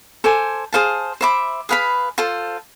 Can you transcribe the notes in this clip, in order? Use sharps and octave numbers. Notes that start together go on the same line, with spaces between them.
A4 C5 G#5 D6
G#4 C5 F5 A5
C5 E5 B5 D6
G#4 B4 F5 B5
F4 A4 C5